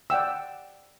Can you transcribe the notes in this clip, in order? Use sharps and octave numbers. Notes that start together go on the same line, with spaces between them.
D5 F#5 G5 E6